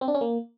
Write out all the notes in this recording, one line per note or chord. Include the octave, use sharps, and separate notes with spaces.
C4
D4
C#4
A#3